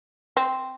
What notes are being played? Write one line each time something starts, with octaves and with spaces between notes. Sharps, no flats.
C4